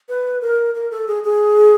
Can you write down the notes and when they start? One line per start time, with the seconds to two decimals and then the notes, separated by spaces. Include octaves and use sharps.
0.09 B4
0.41 A#4
0.75 A#4
0.91 A4
1.08 G#4
1.24 G#4